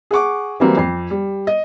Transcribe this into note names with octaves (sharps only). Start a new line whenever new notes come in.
G#4 F#5 C#6 D6
E3 F#3 G3 A#3 C4 E4
F2 C7
G3
D#5